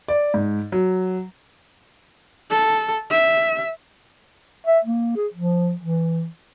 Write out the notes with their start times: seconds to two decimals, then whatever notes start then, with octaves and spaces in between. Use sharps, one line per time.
0.08 D5
0.34 G#2
0.72 F#3
2.51 A4
3.11 E5
4.67 E5
4.85 A#3
5.16 G#4
5.34 F3
5.80 E3